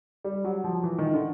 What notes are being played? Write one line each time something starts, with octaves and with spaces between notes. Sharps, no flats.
G3
F#3
F3
E3
D#3
D3